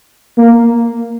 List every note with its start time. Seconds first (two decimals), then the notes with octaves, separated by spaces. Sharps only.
0.38 A#3